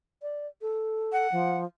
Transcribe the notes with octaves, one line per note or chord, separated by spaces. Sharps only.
D5
A4
F#5
F3